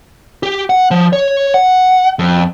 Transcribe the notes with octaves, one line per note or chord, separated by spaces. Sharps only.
G4
F#5
F3
C#5
F#5
F2